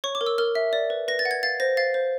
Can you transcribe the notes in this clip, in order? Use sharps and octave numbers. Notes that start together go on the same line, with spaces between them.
C#5 C#6
D6
A#4
E6
A#4 F6
E5
D5
B4
B4 A#6
A6
F#5
G#6
F5 A6
C5 A#6
F5 A6
C5